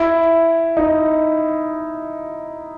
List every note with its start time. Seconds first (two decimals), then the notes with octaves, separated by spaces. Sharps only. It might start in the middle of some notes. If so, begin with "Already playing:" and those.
Already playing: E4
0.77 D#4